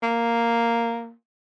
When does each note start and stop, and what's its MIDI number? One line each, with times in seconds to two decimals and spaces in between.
0.03 1.12 58